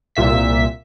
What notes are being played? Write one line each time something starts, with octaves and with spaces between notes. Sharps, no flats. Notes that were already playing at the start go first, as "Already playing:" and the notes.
C2 A#2 E5 B6